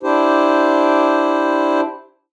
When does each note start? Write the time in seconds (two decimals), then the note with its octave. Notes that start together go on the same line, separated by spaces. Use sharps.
0.03 D4 E4 G4 C5